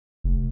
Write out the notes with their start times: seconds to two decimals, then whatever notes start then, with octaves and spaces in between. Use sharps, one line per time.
0.24 F1